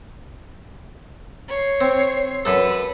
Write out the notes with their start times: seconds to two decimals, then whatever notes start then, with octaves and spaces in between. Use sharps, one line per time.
1.48 C#5 C7
1.81 C4
2.45 F#2 A4 B4